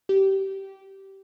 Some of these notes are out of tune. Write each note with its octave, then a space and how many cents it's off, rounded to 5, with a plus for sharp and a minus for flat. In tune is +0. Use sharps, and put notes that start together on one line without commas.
G4 -20